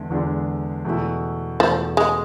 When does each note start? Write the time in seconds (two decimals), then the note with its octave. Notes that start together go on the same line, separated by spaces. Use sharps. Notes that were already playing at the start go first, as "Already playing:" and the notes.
Already playing: E2 D3 G#3
0.10 E2 D3 G#3 D4
0.85 E2 B2 A3 E4
1.60 E2 B2 F3 A3 E4
1.97 G#3